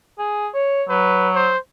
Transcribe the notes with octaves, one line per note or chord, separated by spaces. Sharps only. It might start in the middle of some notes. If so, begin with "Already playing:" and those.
G#4
C#5
F#3 B4
C5